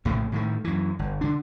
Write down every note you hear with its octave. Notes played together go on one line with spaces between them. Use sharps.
A#1 A2 C#3 A3
A2 D#3 A3
F#2 E3
G1
D3 D4